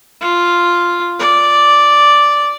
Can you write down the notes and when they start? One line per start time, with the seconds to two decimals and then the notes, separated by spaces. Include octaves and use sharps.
0.21 F4
1.19 D5